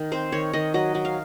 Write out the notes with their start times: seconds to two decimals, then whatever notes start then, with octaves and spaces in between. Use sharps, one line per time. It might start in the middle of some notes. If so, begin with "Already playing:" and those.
Already playing: D#3
0.12 C4 C5
0.32 D#3 C#5
0.53 D#3 D#5
0.74 F#3 D#5
0.95 F#3
1.05 F5